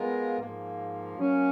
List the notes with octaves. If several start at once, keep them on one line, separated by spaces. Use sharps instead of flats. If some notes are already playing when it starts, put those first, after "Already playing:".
Already playing: G#3 B3 F4 A#4 F5
G#2 F3 A#3
F#3 A#3 C#4